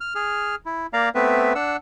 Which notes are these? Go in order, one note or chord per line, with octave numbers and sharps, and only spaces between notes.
F6
G#4 F6
E4
A#3 D5 F5 A#5
A3 B3 C4 B4 E5
D4 F#5 E6